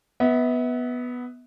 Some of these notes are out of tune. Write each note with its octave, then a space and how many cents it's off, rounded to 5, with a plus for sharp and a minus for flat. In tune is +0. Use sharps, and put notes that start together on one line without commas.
B3 +0 E5 -35